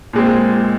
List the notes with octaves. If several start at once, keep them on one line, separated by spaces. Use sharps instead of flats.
A#2 G#3 C4